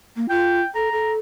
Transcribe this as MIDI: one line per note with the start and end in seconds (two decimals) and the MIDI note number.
0.16 0.26 58
0.29 0.61 65
0.29 0.68 79
0.75 0.89 69
0.75 1.12 82
0.92 1.19 69